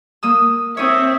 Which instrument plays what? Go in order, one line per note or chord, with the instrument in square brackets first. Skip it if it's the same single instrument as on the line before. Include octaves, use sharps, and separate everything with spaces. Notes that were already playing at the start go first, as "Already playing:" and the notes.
[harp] A#3 D#6 E6
[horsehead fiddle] C4 E5 [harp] C#5 D#6